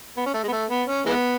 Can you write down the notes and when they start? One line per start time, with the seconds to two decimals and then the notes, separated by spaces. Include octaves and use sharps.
0.17 B3
0.26 C#4
0.34 A3
0.43 G#3
0.48 B3
0.52 A3
0.70 B3
0.88 C#4
1.06 E3 G#3 B3